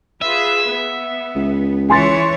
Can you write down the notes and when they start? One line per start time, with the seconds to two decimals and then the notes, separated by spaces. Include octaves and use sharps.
0.22 F4 G#4 B4 E5
0.70 B3
1.35 C#2
1.90 E3 C#5 G#5 C6 A6